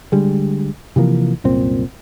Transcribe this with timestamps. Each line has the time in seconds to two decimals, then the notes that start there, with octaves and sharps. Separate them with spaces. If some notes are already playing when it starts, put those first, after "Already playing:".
0.12 D3 G3 G#3
0.96 C3 E3 F3 A#3
1.44 C2 F#2 A#2 C4